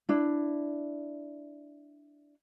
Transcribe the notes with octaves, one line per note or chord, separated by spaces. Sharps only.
D4 E4